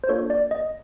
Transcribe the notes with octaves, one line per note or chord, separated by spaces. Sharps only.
C5
A#3 D4 F4 A4 C#5
D5
D#5